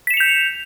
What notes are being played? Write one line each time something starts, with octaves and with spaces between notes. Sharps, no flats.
G6 B6 C#7 E7 F7